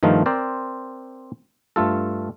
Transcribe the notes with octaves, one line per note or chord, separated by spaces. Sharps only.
G2 D#3 F3 A3 D#4 F4
C4 A#4 C5 D5
G2 A3 F4 A4